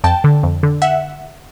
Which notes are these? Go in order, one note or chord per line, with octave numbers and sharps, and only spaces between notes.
F2 G5 A5
D3
F2
D3
E5 F#5